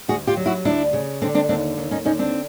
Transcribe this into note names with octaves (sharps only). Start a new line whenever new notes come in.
D2 F#4 G#4
F4 G4
F#3
E4 F#4
D2 D4 E4
C#3
D3 C4 D4
C4 D4
D#2 C4 D4
D#2
C#4 D#4
D3 C#4 D#4
C4 D4